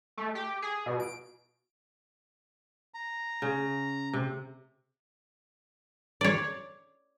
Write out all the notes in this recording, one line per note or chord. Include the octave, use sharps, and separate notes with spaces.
A3
G4
G#4
B2
D7
A#5
C#3
C3
C#5 D5